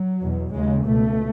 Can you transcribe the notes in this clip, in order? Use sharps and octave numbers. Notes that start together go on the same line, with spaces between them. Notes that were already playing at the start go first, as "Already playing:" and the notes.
Already playing: F#3
E2 B2
D#2 C#3 G#3
C#2 B2 A3